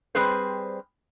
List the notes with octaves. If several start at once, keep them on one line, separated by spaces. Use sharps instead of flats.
G3 C4 G#4 B4 C5